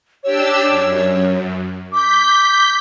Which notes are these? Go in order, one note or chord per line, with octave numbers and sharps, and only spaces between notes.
D4 G4 C#5 E6
F#2
D6 G6 B6